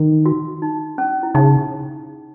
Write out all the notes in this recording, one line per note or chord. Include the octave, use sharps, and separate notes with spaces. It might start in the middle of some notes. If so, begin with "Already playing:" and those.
Already playing: D#3
F#4
D#4
C#4
E4
C#3 D#4